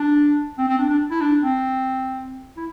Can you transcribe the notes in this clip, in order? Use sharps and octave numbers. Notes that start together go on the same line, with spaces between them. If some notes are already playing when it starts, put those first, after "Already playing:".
Already playing: D4
C4
C4
D4
D4
E4
D4
C4
E4